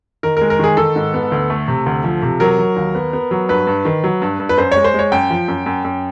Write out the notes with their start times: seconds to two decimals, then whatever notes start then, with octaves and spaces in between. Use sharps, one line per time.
0.23 D#3 A#4
0.37 A#4
0.41 G#3
0.50 A#4
0.59 D#3 G#4
0.77 D#3 A4
0.96 G#2
1.14 B3
1.32 D2
1.50 A3
1.68 C3
1.86 D2
2.04 F3
2.22 C3
2.40 F#3 A#4
2.58 F#3
2.76 D#2
2.95 B3
3.13 B3
3.31 F#3
3.49 G2 B4
3.67 G2
3.85 D#3
4.04 F#3
4.22 G2
4.40 G2
4.49 B4
4.58 F#2 C5
4.72 G#3 C#5
4.84 C5
4.94 G#3 C#5
5.12 F#2 G5
5.30 F3
5.48 F#2
5.66 F#2
5.85 F#2